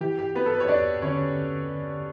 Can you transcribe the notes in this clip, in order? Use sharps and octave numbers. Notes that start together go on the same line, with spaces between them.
E3 G4
G4
B3 F#4 B4
A4
B4
C#5
E2 D4 D5
D3 C#4 C#5